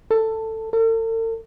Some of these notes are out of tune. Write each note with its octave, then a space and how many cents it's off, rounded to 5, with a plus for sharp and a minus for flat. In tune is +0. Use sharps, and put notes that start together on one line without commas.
A4 +15
A4 +45